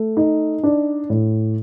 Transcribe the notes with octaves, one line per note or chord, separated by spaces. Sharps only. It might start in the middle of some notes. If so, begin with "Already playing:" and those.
Already playing: A3
D#4
D4
A2